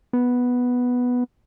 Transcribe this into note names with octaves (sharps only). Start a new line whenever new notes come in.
B3